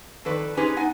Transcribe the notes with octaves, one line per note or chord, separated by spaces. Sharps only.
F2 D#3 A4 B4 D5
C#4 D#4 G4 G#4 B4 C5
B3 D#4 F#5 G#5